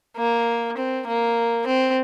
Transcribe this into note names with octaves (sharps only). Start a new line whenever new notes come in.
A#3
C4
A#3
C4